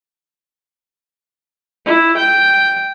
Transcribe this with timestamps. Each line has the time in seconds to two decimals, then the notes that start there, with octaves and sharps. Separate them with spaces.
1.85 E4
2.17 G5